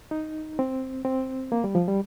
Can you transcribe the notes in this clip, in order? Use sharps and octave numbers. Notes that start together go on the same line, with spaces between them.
D#4
C4
C4
A#3
G3
F3
G3